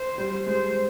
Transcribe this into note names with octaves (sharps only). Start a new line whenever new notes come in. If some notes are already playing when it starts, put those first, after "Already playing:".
Already playing: C5
G3
G#3 C5